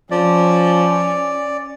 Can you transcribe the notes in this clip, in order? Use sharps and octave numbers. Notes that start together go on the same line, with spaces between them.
F3 C#4 D5